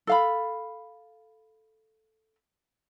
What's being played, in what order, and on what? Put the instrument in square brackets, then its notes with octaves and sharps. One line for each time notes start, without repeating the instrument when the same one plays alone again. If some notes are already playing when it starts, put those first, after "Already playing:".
[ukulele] A4 F5 B5